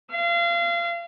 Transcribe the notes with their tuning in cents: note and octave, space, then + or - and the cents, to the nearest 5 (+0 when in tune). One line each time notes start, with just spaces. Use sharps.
F5 -30